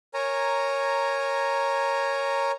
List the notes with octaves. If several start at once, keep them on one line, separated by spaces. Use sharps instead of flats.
A#4 C#5 G#5 A#5